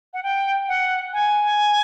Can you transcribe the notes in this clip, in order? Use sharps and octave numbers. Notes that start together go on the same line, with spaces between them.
F#5
G5
F#5
G#5